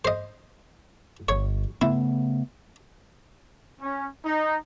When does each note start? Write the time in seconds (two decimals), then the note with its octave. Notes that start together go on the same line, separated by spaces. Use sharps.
0.05 C5 D#5
1.29 G1 C#5
1.82 C#3 A3 B3 E4
3.82 C#4
4.25 D#4